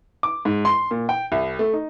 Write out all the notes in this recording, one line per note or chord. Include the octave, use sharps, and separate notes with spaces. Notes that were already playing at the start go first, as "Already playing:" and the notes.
D6
G#2
C6
A#2
G5
C2
A3
D#4